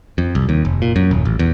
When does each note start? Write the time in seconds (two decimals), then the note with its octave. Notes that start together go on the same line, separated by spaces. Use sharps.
0.18 F2
0.35 C2
0.49 D#2
0.65 F1
0.82 A#2
0.96 F#2
1.11 D#1
1.25 A1
1.39 E2